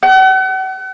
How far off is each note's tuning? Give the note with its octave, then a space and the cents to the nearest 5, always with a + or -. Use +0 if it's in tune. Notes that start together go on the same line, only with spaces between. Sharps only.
F#5 +40